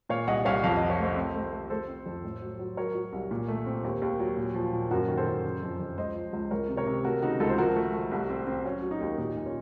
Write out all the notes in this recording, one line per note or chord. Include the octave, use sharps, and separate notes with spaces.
A#2 C#5 F5
C2 D#5 F#5
C2 C#5 F5
F2 F5
D#5
F3
C#5
A3 C5 D#5
C4
A3
A3
A3 A4 C5
C4
F2
A2
F#3
F#3
F#3 A#4 C#5
F#3
C2
A#2
A3
C4
D#2
D#2
F#3
A#2
F3
A#2
F#2 F#4 A#4
D#3
A4 C5
F#2
C#3
F2
F2
C#2 C5 D#5
F3
C#2
C#2 A#4 C#5
C3
A#4 C#5
C3
A3 F#4 A#4
C#3 D#4 F#4
C#2 F4 A4
C5
F3 F#4 A#4
A3
A3
C2
C4
C4
F#3 C#4
F#3
D#4
D#2
A#2 D#4
A#2
C#4 F4